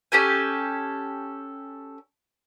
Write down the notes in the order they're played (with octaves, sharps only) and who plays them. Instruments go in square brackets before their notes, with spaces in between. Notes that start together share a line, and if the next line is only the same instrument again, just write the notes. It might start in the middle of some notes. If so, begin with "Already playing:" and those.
[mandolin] C#4 G4 A4 G#5